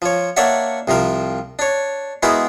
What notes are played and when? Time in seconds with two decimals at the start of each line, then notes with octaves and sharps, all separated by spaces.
0.02 F3 C#5
0.37 A#3 D4 C#5 D5 E5 F#5
0.88 C2 C3 F3 A#4
1.59 D4 C#5
2.23 G#3 B3 E4 F#4 G#4 A#4